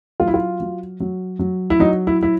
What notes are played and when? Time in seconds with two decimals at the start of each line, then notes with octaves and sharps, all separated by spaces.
0.20 F#3 F4
0.28 E4
0.34 F4
0.60 F#3
1.00 F#3
1.39 F#3
1.70 E4
1.80 F#3 D#4
2.07 E4
2.23 E4